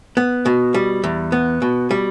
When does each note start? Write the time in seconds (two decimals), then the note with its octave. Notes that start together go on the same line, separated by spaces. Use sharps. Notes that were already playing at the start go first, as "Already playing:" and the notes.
0.17 B3
0.46 B2
0.74 G3
1.04 E2
1.32 B3
1.62 B2
1.91 G3